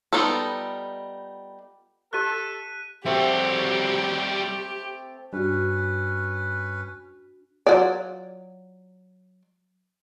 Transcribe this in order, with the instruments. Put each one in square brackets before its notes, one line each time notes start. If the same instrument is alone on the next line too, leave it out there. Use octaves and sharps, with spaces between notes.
[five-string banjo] G3 B3 D#4 F4 A4
[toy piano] G4 D#5 C#6 [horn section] A4 [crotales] F#6 B6 D#7
[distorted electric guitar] G3 F#4 [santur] A3 C4 A4 [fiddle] G4
[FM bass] G2 [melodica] C#4 B4 [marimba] D4 F#4
[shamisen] F#3 F4 D5